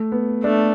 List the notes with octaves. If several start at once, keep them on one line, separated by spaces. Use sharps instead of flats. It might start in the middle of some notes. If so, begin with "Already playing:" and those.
Already playing: A3
B3
A3 D4